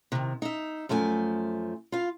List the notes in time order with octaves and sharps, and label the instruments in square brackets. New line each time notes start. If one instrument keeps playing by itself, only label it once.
[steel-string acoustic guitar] C3 D#3
D#4 E5
F#2 F3 A3 G#5
F4 F5